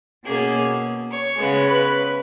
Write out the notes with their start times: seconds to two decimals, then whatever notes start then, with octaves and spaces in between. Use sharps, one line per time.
0.24 B2 A#3 C#4 G#4
1.09 C#5
1.37 C#3 G#3 B3
1.66 B4